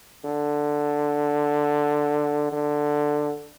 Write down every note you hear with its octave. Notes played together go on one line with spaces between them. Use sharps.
D3
D3